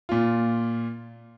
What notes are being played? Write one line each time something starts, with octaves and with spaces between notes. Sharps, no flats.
A#2 F4